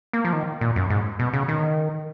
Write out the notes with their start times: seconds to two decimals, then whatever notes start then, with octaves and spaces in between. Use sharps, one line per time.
0.13 A#3
0.25 F3
0.33 D#3
0.61 A#2
0.76 F#2
0.90 G#2
1.19 B2
1.33 C#3
1.48 D#3